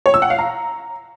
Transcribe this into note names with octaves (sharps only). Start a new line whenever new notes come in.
C#5
E6
F#5
F5
A#5